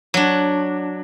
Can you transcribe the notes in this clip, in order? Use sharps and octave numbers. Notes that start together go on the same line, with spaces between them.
F#3 D4